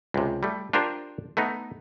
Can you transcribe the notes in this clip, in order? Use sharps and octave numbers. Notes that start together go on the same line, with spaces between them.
C#2 C3
G3 A3
D4 F4 G4 A#4 C5
A3 B3 D#4